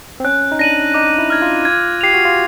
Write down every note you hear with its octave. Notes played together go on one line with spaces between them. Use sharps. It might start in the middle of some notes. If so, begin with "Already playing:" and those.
C4
C#4 F#6
D#4
D4 A#6 D#7 F#7
D#4 D6
E4
F6 G#6
F4
G#6
G4 C7 F7
F#4
F4